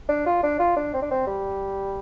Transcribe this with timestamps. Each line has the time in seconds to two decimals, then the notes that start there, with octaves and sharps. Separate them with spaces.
0.09 D4
0.26 F4
0.43 D4
0.59 F4
0.76 D4
0.94 C4
1.02 D4
1.11 C4
1.27 G3